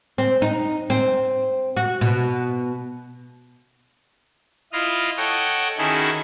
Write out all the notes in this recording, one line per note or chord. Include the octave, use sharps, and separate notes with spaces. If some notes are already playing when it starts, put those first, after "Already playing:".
C4
D#4
C4
F#4
B2
E4 F4 D#5 F5
A4 C#5 D#5 F#5 G5
D#3 C#4 E4 F#4 G#4 A4